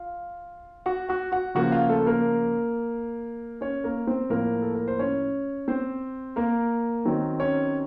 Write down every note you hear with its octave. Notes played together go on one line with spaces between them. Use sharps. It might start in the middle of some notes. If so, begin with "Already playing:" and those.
Already playing: F4 F5
F#4 F#5
F#4 F#5
F#4 F#5
C#3 F3 A#3 F#4 F#5
F4 F5
A3 A4
A#3 A#4
C#4 C#5
A#3 A#4
C4 C5
A2 F3 A#3 A#4
A4
A#4
C5
C#4 C#5
C4 C5
A#3 A#4
D#3 F#3 C4
C#4 C#5